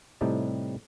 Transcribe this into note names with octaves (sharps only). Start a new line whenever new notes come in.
A2 C3 G3 D#4 G4 A5